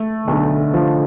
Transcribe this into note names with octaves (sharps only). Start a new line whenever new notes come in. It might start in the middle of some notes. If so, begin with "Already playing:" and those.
Already playing: A3
B1 D3
F3